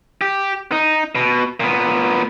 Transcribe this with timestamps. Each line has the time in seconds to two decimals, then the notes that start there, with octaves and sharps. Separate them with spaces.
0.21 G4
0.72 D#4
1.15 B2
1.60 A#2 B3